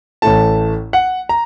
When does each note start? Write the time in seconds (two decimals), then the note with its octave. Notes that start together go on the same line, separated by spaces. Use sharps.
0.22 A1 A2 A3 A5
0.93 F#5
1.29 A#5